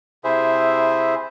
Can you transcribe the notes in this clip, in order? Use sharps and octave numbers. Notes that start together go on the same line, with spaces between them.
C3 E4 G#4 C5 E5